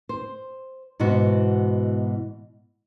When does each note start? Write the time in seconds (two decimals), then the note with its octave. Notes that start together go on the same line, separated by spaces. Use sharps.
0.09 C5
1.00 G#2 B2 E3 B3 F#4